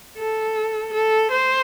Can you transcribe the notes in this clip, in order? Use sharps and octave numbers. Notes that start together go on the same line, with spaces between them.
A4
A4
C5